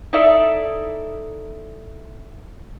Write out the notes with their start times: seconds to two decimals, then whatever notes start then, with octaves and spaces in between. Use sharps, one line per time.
0.13 D#4 E4 A4 D5 E5